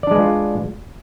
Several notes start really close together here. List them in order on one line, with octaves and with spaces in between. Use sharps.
D5 D4 G#3 B4 F4